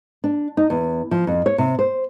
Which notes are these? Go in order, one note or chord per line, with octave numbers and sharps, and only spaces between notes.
D4
D#4
E2
F3
F2
C#5
C3
C5